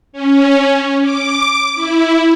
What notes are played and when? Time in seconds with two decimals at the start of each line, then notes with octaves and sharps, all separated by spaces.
0.13 C#4
1.02 D6
1.75 E4